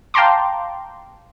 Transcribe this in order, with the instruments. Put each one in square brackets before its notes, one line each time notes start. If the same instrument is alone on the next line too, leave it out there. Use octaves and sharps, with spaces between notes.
[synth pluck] F5 G5 A5 A#5 C6 D6